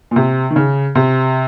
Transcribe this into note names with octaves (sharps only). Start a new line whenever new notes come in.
A#2
C3
D#3
C#3
C3